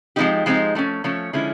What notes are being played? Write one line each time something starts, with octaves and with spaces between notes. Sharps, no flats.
F3 G#3 C4 D#4 G4
F3 G#3 C4 D#4
F3 A3 C#4
F3 A3 C#4 C#5
D3 F3 G#3 C#4 E4